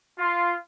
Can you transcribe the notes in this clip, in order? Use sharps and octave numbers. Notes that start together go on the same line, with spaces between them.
F4